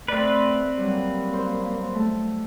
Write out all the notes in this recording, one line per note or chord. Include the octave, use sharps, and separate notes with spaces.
A3 C4 B4 D5
F#3 G3 A#3
C5
A3